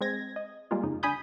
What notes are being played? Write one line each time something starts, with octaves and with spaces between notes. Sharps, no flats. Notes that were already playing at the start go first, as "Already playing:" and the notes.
G#3 C4 G#6 A#6
D#5
G3 G#3 A#3 F4
F2 C#3 D#4
D3 G#5 B5 D#6 G6